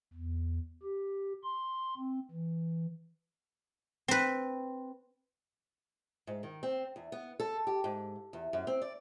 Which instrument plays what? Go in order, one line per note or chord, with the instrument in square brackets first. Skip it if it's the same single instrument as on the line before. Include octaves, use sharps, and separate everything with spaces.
[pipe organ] E2
G4
C6
C4
E3
[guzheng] C4 B4
[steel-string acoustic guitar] G#2
D#3
C4
E2
B3
A4
G4
G#2
E2
F#2
C4
D5